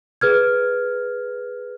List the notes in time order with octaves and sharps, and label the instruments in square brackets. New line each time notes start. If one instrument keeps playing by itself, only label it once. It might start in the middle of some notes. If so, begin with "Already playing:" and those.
[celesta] G#4 B4 F6 G#6